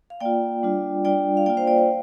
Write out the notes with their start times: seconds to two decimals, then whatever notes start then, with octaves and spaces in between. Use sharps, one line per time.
0.10 F5
0.21 A#3 F4 D5 G5
0.63 G3 D4 F4
1.05 G3 D4 F4 D5 G5
1.37 F5
1.46 A#3 F4 D5 G5
1.57 C5 F5
1.67 D5 G5
1.78 C5 F5